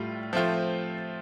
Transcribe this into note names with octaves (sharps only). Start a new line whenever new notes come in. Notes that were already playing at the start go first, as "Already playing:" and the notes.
Already playing: A2 G3 F4
F3 A3 C4 F4